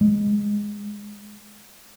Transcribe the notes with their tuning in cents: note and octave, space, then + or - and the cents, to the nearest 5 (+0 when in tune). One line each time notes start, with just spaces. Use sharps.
G#3 -10